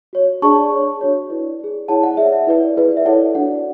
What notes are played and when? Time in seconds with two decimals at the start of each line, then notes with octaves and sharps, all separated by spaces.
0.13 F#4 C#5
0.42 D4 G#4 D5 A5 C#6
0.72 G#4 C#5
1.01 D4 F#4 C#5
1.30 E4 B4 D5
1.60 G#4 D5
1.88 E4 G#4 C#5 F#5 A5
2.03 D5 F#5
2.17 G#4 C#5 E5
2.32 E5
2.47 E4 B4 D5
2.77 E4 G#4 B4 D5
2.97 E5
3.06 E4 A4 C#5 D5 F#5
3.35 D4 F#4 C#5 D5 F#5